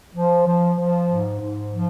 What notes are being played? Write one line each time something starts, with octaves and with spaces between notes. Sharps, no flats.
F3
F3
F3
G#2
G#2
F3